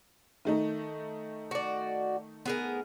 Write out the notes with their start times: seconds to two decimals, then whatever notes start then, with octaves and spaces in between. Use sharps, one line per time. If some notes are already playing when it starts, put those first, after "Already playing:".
0.45 D#3 A3 D#4
1.51 F#4 D5
2.46 B3 G#4 A#4